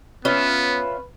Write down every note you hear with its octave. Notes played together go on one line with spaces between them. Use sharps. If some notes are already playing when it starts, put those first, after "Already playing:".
B3 C#4 F4 B4 E5